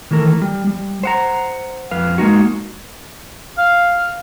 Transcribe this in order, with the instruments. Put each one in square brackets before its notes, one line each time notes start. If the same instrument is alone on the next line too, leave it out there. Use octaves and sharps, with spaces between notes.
[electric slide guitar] D#3 E3 A3 A#4
G3
G3
C5 F#5 A#5
F2 B4 F5
G#3 A#3 D#4 F#4
[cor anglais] F5